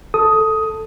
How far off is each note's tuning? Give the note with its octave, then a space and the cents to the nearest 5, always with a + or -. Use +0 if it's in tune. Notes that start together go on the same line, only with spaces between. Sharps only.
A4 +0 D#6 +10